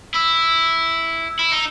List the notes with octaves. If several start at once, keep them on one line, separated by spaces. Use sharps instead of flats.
E4
E4
D#4